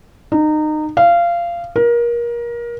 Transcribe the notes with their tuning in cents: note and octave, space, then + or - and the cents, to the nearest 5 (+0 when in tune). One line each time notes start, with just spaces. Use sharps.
D#4 -25
F5 -20
A#4 +25